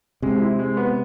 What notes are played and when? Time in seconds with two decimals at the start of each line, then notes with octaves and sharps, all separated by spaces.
0.22 C3 G#3
0.42 E4
0.59 G#3
0.77 B3